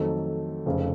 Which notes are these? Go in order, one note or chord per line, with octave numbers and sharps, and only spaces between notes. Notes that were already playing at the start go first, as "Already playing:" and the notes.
Already playing: F2 D#3 F#3 A3 D#4
F1 F2 C#3